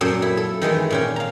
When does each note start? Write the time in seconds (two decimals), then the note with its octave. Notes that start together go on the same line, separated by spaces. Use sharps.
0.01 F#2 A#2 A4 C5 G5
0.22 E4
0.37 A4
0.62 D#3 E3 G#3 A3
0.90 A#2 C#4 G5
1.16 F5 A#5